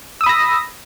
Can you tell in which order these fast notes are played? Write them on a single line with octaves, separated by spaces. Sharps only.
E6 D#6 B5 A#6